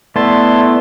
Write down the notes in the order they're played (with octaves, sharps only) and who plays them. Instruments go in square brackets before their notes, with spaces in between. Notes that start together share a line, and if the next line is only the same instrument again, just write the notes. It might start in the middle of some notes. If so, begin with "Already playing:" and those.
[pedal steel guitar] A3 B3 E4 [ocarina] D5 [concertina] A5 C6